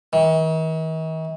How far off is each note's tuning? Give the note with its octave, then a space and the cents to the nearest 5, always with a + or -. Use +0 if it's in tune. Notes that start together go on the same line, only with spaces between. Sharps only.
D#3 +45